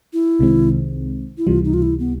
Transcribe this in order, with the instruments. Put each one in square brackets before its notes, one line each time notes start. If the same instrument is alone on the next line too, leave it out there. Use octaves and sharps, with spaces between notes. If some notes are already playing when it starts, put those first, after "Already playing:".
[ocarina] E4
[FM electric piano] C2 C3 D#3 G#3 C4
[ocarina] E4
[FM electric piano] C#2 C3 E3 G3 [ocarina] F4
[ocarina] D#4
F4
E4
B3